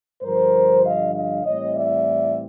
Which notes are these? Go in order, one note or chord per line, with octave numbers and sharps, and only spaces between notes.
G2 D3 F3 A#4 C5
D#5 F5
D#5 F5
A2 E3 G3 C4 C#5 D#5
D5 E5